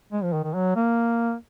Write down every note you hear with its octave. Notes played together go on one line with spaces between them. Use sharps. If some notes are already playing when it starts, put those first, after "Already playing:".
G#3
F3
D#3
D#3
F#3
A#3